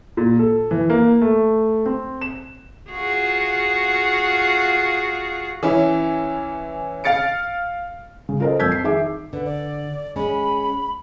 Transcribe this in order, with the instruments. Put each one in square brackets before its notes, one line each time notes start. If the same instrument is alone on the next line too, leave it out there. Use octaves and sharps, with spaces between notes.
[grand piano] A#2
A4
E3
A#3
A3
C4
E7
[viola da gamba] F4 F#4 G#4
[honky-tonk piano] E3 C#4 E4
F5 F6 A6 C#7 D7
[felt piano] C#3
F4 A4 A#4 C5 D#5
F2 E6 G6 G#6 B6
C7
D#3 G#4 E5 D6
[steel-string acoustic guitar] D3 [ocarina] B4
[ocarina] D5
[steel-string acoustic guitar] G#3 C#4 [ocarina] B5